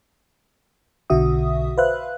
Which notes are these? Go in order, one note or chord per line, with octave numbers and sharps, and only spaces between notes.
B1 B2 D3 F#4 E5 D#6
B4 C5 E5 F5 F#6